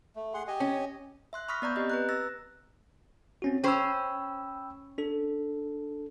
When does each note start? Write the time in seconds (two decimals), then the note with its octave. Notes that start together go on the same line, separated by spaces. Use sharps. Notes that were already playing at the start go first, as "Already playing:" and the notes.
0.16 A3
0.34 G#4 F#5 C6
0.47 G4 D#5 G#5
0.60 C#4
1.33 E5 C6 F#6
1.48 B5 C#6 D#6 F6 A#6 B6
1.62 B3 D5 A#5 G6
1.76 C4 G4 D#5
1.90 B4 A#5 F#6
2.09 E6 A6 A#6
3.42 C4 C#4 F#4
3.64 C#4 C5 G5 B5 E6
4.98 D4 A4